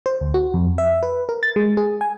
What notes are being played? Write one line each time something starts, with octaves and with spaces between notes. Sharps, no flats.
C5
D2
F#4
F2
E5
B4
A#4
A6
G#3
G#4
G#5